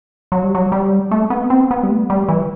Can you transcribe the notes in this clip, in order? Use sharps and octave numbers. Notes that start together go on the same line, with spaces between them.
F#3
G3
F#3
G3
A3
B3
C4
B3
G3
A3
G3
E3